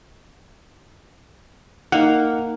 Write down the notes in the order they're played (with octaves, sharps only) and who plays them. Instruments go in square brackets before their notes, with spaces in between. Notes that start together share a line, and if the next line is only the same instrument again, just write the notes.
[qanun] A#3 [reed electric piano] D#4 F#5